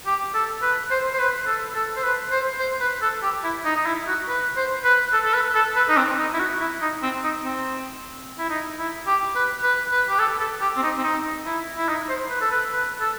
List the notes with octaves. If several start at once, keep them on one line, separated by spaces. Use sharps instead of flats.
G4
A4
B4
C5
C5
B4
A4
A4
C5
B4
C5
C5
B4
A4
G4
E4
D#4
D#4
E4
F#4
B4
C5
B4
A4
A4
B4
A4
B4
D#4
C4
D#4
E4
F#4
E4
D#4
C4
D#4
C4
E4
D#4
E4
G4
B4
B4
B4
G4
A4
A4
G4
C4
D#4
C4
D#4
E4
E4
D#4
C5
B4
A4
B4
B4
A4